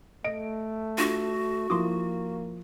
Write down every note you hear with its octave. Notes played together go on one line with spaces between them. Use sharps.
A3 D#5 D7
D4 F4 F#4
F3 A#3 E4 C6 D6 D#6